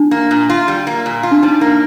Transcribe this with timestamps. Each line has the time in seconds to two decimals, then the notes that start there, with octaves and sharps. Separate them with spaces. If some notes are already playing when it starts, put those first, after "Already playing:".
Already playing: D4
0.11 A#3
0.31 A#2
0.50 F4
0.68 G3
0.87 A#3
1.06 A#2
1.23 F4
1.31 D4
1.43 G3 D#4
1.61 A#3